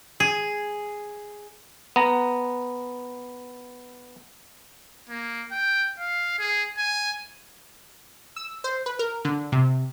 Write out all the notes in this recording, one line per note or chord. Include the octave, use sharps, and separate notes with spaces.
G#4
B3 A#5
A#3
G5
F5
G#4
G#5
E6
C5
B4
A#4
D3
C3